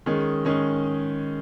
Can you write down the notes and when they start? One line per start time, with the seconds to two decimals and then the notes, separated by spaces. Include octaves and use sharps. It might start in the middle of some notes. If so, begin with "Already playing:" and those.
0.06 D#3 G#3 C#4 G#4
0.45 D#3 G#3 C#4 G#4